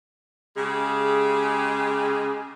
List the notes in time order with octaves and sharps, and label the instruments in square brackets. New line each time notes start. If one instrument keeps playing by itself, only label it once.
[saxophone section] C#3 G#3 G4 G#4